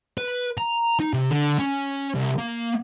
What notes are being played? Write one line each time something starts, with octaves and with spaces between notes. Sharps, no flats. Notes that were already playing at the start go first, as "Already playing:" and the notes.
B4
A#5
D#4
C3
D3
C#4
C2
A#3